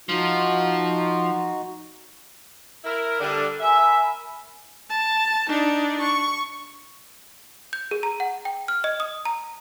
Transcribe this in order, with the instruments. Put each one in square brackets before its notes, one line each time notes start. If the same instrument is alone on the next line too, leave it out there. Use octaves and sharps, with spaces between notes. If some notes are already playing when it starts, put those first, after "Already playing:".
[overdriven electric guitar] F3 [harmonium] D#4 F#4
[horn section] E4 A#4
D3 G3 D4
[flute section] A#4 G#5 B5 [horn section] E5
[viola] A5
D4 D#4
C#6
[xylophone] G6
G#4
A#5
F#5
G5
F6
D#5
D#6
A#5